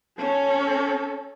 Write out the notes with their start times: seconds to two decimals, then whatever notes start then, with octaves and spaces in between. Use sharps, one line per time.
0.18 C#4 A4